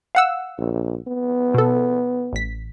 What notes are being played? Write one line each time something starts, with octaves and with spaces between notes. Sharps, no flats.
F5 F#5 E6
A#1
B3
B2 A4
A1 B6